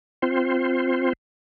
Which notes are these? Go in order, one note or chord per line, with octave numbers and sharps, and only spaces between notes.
C4 F4 C5